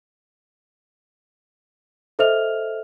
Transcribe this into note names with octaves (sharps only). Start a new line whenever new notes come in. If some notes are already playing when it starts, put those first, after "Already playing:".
A4 C5 D#5 E5 F6 F7